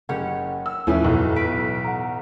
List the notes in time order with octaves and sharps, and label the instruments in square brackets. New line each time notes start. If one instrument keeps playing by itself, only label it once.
[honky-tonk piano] F#1 [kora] C#4 G4 C#5 [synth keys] F#5
[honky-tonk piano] E6
[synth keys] D#2 [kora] A2 E3 B4 [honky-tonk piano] F3 C#4
[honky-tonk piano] B1 [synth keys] F2 B2 F4
[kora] B4 [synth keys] B6 D7
[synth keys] F#5 A#5